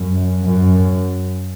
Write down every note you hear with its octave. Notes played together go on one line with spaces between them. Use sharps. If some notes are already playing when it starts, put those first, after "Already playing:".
Already playing: F#2
F#2